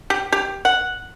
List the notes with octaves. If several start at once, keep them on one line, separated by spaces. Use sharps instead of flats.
G4
G4
F#5